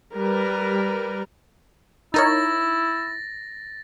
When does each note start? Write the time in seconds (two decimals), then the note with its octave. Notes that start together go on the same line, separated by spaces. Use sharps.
0.15 G3 A#4 B4
2.14 D#4 E4 A#4 C#5 A6 A#6